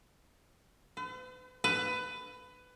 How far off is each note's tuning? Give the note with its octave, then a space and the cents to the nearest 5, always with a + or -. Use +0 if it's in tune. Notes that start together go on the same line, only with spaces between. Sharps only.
B4 +45
B4 +20